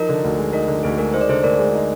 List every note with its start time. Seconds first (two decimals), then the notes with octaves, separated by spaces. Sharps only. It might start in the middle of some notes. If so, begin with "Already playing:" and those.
Already playing: F3 D#4 A#4
0.09 D3
0.24 D2
0.38 G#3
0.53 D#4 A#4
0.68 D3
0.83 D2 G#4
0.98 G#3 A#4
1.14 D#4 C5
1.21 D5
1.29 D3 G#4 C5
1.44 D2 A#4 D5
1.59 G#3
1.73 D#4